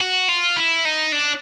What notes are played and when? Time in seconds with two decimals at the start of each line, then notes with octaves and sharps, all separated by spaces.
0.01 F#4
0.29 F4
0.56 E4
0.85 D#4
1.12 D4